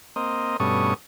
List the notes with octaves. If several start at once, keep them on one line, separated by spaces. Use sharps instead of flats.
A#3 C4 D#5
G2 B2 A3 C#4 C#6 D#6